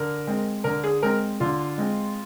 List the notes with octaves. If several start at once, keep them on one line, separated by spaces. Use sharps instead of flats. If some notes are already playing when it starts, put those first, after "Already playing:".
Already playing: D3 A#4
G#3 C4
D3 A#4
G#4
G#3 C4 A#4
D3 F4
G#3 C4